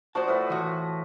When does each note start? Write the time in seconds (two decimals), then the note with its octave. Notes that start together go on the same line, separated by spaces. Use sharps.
0.15 F3 F#4 C5 D5 A5
0.28 A2 B4
0.50 E3 F#4